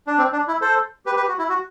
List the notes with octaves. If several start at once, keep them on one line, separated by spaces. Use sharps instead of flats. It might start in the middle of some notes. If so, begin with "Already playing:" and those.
D4
C4
D4
E4
A4 C5
G4 B4
G4 B4
F#4
E4
F#4